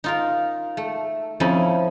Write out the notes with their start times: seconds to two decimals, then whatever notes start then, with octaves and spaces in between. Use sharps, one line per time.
0.04 D#4 F4 A#4
0.77 A3
1.40 F2 F3 C#4 D#4 E4